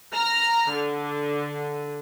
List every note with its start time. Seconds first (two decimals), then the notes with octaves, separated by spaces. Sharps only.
0.14 A#5 F6
0.72 D3